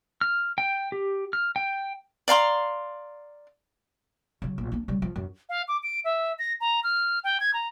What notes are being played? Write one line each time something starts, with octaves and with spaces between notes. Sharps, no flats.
F6
G5
G4
F6
G5
D5 F5 A#5 C6
C#3 F#3
A#1
A#3 D4
C#3 G3
F3
F#2
F5
D6
D7
E5
A#6
A#5
F6
G5
G#6
A#5